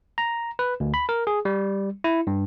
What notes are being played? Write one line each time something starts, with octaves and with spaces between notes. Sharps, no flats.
A#5
B4
D2
B5
A#4
G#4
G3
E4
G2